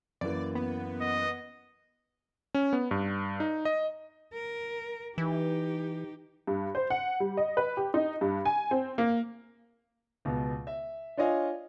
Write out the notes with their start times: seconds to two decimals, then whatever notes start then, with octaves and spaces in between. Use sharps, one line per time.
0.21 F#2 E3 A#3 D5
0.55 B3
1.01 D#5
2.55 C#4
2.73 B3
2.91 G2
3.40 D#4
3.65 D#5
4.33 A#4
5.18 E3 D#4 G4
6.47 G2
6.75 C5
6.90 F#5
7.20 G3
7.37 D#5
7.57 B4
7.77 G4
7.94 D#4
8.21 G2
8.45 G#5
8.71 C4
8.98 A#3
10.25 C#2 B2
10.67 E5
11.17 D4 F4 C#5 D#5 F5 G#5